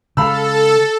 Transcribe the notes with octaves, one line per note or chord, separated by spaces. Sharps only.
C#3 G#3 A4 F5 B5 E6